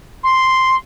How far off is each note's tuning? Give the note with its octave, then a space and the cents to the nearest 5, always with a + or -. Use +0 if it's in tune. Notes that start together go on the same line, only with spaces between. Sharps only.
C6 +0